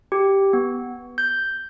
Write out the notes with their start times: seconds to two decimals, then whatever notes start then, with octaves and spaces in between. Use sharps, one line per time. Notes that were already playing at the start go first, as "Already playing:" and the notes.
0.12 G4
0.53 B3
1.18 G6